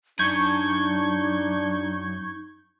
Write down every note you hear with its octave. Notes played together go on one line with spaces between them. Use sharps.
F#2 D4 D#4 C#6 G6 G#6